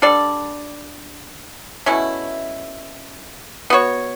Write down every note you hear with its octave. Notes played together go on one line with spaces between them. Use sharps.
G3 D4 A4 D5
B2 A3 C#4 E4
B3 F#4 C#5